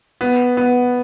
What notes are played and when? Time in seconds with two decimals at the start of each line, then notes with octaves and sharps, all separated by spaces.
0.21 B3
0.57 B3